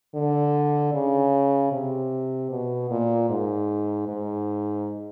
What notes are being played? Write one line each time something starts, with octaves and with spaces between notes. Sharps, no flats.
D3
C#3
C3
B2
A#2
G#2
G#2